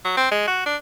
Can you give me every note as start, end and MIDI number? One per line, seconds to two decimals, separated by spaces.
0.05 0.12 54
0.17 0.30 60
0.32 0.45 56
0.48 0.62 66
0.66 0.76 62